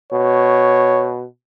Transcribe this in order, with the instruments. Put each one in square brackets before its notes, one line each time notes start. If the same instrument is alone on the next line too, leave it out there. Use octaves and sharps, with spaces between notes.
[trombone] B2 [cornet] C#5